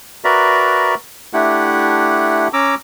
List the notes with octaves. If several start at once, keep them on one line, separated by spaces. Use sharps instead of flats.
F#4 A#4 B4 D5 E5 A#5
A3 D4 E4 G4 F#5
C#4 A#5 D6 E6